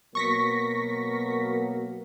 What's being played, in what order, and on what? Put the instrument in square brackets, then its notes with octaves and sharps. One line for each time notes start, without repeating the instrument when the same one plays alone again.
[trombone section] B2 F#3 A#3 [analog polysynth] C#6 A#6 B6